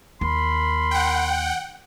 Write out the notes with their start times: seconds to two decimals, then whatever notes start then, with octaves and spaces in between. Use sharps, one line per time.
0.21 D#2 A#4 B5 C6
0.91 F#5 G5